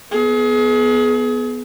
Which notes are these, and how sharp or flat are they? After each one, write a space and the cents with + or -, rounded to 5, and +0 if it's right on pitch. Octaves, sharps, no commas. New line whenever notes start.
B3 +0 G#4 +30